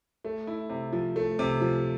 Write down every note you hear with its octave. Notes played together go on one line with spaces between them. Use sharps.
A3
E4
C3
F3
A3
C3
F3